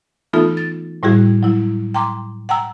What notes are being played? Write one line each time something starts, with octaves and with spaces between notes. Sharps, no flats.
E3 A3 B3 D#4 F4 A4
A6
A2 G3 E4 F#4 G#4
F#3 E4
G5 A#5 C6 D6
F#5 G5 A#5 E6